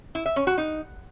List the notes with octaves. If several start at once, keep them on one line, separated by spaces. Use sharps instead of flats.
E4
E5
C#4
F#4
D#4